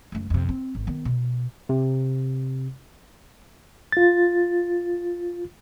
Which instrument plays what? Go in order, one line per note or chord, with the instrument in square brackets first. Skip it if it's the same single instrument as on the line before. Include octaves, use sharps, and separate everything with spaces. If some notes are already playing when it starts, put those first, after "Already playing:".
[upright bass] F#1 A3
F2 C3
C4
G#1
D#3 B3
B2
[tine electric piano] C3
[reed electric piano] F4 A6